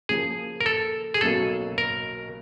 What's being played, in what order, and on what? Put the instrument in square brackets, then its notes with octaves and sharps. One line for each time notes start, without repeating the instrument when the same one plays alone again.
[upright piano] C#3 F3 A#3 [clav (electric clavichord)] G#4
[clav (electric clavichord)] A#4
A4
G#4
[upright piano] B1 B2 F#3 A#3 C#4 [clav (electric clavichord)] A4
[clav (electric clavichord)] A#4